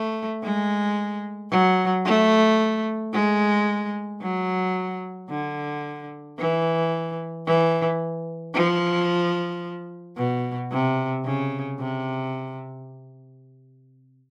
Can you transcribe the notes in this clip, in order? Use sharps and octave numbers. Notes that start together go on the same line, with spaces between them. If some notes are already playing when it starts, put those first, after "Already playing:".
Already playing: A3
G#3
F#3
A3
G#3
F#3
D3
E3
E3
F3
B2
C3
C#3
C3